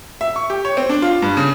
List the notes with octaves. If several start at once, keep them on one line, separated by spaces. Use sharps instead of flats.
E5
C#6
G4
C#5
C4
D4
F4
G2
C#3